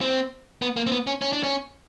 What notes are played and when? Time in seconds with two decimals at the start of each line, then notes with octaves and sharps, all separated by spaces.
0.01 C4
0.62 B3
0.77 A#3
0.87 C4
0.92 B3
1.07 C#4
1.22 C#4
1.32 D4
1.43 C#4